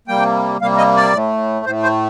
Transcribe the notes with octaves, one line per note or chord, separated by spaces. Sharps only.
C3 G3 A#3 G5
C3 G3 A#3 F5
D#5
D5
A2 A3
A2 A3 C5
C5